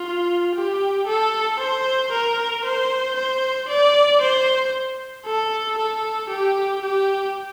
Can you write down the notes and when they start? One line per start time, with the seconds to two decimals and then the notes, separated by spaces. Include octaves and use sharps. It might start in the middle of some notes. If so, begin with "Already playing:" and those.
Already playing: F4
0.55 G4
1.07 A4
1.60 C5
2.12 A#4
2.65 C5
3.16 C5
3.69 D5
4.21 C5
5.26 A4
5.78 A4
6.29 G4
6.82 G4